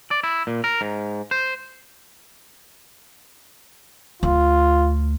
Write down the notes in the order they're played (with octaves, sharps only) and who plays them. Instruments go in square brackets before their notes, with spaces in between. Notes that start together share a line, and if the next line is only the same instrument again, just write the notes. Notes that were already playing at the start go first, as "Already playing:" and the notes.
[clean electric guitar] D5
E4
A#2
A#4
G#2
C5
[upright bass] D2 [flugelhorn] F4